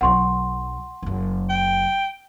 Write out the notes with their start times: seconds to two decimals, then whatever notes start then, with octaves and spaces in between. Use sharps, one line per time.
0.01 B1 F#3 F#5 C6 C#6
1.02 F#1 F#2
1.50 G5